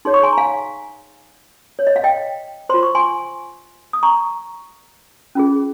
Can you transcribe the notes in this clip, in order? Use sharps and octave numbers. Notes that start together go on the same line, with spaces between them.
D#4 G#4 C#5 C6
C#6
G#5 C6
A#5
F5 G#5
C#5
D#5
F5
D#5 G5
F4 C5 C6
C#6
G#5 C6
D#6
A#5 C#6
C#4 F4 G#4